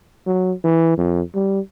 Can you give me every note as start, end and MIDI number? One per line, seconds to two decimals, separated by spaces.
0.27 0.53 54
0.64 0.95 52
0.98 1.21 41
1.35 1.60 55